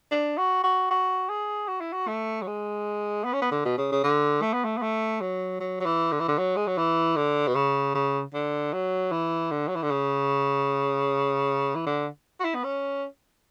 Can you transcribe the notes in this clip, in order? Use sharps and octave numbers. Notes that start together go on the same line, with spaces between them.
D4
F#4
F#4
F#4
G#4
F#4
E4
F#4
A3
F#3
G#3
B3
C#4
B3
D3
B2
C#3
C#3
D3
A3
B3
A3
B3
A3
F#3
F#3
F#3
E3
D3
E3
D3
F#3
G#3
F#3
E3
D3
B2
C#3
C#3
D3
F#3
E3
D3
F#3
E3
D3
C#3
E3
D3
F#4
E4
B3
C#4